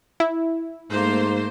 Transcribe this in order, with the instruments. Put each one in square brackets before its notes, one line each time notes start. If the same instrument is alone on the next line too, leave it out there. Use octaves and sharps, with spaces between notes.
[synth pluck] E4
[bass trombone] G#2 [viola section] A3 A#3 C5